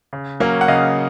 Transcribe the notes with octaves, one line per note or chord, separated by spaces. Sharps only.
C#3
F#3 A#3 C#4
F#5
C#3 D#5 F5